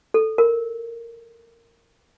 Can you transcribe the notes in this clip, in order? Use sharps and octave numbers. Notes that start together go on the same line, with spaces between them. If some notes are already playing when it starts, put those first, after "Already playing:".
A4
A#4